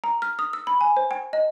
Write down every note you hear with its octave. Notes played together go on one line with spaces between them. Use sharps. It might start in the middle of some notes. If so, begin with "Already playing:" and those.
A#5
F6
D#6
E6
B5
G#5
C5
G5
D#5